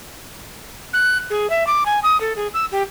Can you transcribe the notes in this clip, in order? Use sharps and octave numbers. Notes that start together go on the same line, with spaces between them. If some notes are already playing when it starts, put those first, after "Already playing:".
F#6
G#4
E5
D6
G#5
D#6
A4
G#4
E6
G4